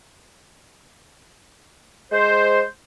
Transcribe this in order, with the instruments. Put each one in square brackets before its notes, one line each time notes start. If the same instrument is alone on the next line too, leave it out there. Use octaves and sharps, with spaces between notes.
[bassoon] G#3 [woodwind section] C5